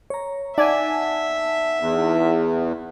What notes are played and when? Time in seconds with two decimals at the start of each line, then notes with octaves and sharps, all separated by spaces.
0.10 C#5 A#5
0.58 D#4 D5 E5 F#5 G#5 A5
1.80 E2